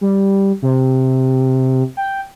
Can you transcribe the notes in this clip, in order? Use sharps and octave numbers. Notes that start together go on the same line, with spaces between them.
G3
C3
G5